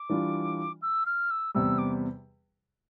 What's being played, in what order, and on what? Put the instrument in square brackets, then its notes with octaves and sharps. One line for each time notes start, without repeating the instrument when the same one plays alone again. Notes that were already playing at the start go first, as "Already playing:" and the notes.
Already playing: [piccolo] D6
[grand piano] E3 G3 D4 F4
[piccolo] E6
F6
E6
[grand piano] E2 C3 G3 [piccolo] E6
[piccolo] D6